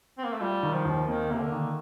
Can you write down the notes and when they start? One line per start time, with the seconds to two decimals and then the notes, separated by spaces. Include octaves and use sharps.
0.18 C4
0.25 A#3
0.34 A3
0.41 G3 F4
0.63 D#3
0.74 F3
0.85 D#2
1.08 D#3 A#3
1.30 C3 A#3
1.41 D3
1.52 D#3